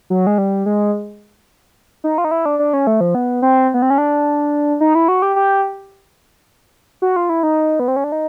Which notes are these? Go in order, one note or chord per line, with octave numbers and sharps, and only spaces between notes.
F#3
G#3
G3
G#3
D#4
F4
D#4
E4
D4
D4
C#4
A3
F3
B3
C4
B3
C4
C#4
D4
D#4
E4
F#4
G4
G4
F#4
F4
E4
D#4
B3
C4
C#4
D4
D#4